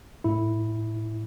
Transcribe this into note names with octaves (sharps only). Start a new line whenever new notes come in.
A2 E4